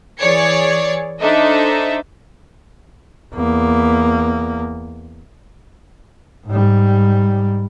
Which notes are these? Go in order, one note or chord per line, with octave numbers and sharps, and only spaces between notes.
E3 G#4 C#5 D5 G#6 C#7
D4 D#4 A4 C5 D#5 E5
E2 A#3
G#2 G3